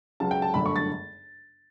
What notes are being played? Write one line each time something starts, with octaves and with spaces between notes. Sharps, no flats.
C#2 C#3 F#3 A5
G5
A5
G1 F#2 D3 A3 B5
C#6
A6